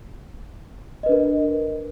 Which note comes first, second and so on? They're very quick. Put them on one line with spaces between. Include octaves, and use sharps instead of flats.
D#5 B4 D4 A#4